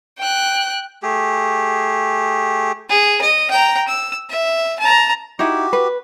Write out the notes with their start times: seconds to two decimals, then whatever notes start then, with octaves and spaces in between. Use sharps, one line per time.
0.18 G5 F#6
1.03 A3 G4 G#4
2.90 G#4
3.22 D#5
3.51 G5 A#5
3.88 E6
4.30 E5
4.80 A5 A#5
5.39 D#4 E4 F#4 G4
5.73 B4